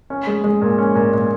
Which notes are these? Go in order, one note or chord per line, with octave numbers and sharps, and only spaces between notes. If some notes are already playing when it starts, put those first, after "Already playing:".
C#4
G#3
G#3
A#2
C#4
A#2
A#2